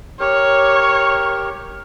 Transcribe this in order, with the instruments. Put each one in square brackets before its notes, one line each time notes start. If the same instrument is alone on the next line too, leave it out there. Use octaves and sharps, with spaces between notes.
[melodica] G4 A#4 [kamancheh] C#5